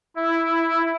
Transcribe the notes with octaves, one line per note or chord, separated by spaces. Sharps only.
E4